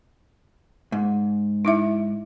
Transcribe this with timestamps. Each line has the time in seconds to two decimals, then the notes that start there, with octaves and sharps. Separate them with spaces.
0.92 G#2
1.65 D#4 E4 E5